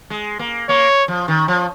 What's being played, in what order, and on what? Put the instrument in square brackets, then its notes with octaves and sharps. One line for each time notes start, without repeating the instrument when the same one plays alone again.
[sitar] G#3
A#3
[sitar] A#3 [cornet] C#5
[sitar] F3
D#3
F3